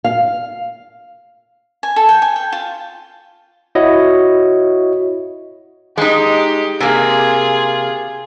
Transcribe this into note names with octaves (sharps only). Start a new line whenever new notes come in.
F5
G#5
A4
G5
G#5
G5
F4
E4 F#4 C#5 D#5
G#3 D#4 G4
C3 A#3 F4 G#4